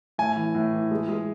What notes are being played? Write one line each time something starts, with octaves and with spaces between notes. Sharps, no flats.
A2 G#5
E3
A2
E3
G#3
G#3